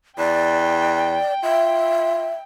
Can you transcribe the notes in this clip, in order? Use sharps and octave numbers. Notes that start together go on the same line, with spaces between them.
E2 D5 G5
F4 E5